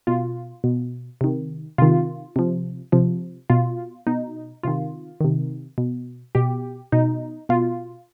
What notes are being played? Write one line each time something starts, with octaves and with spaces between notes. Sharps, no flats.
B2 F4
B2
C3 D#3
C3 D#3 F4
C3 F3
C3 F3
B2 F4
B2 D#4
C3 D#3 F4
C3 D#3
B2
B2 G4
B2 D#4
B2 F4